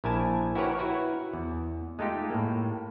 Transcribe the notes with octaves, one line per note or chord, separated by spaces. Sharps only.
A#1 E4 A#4 G#5 A5
E4 F#4 G4 A#4 B4 C#5
E4 F#4 B4 C#5
E2
G#3 A3 D#4 F4 G4
A2 A#3